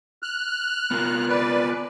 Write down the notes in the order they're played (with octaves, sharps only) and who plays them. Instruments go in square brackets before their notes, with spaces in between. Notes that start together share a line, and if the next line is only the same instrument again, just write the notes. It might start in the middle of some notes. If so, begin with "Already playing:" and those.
[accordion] F6 F#6
[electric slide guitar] B3 F4 A#4
[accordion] B4 D5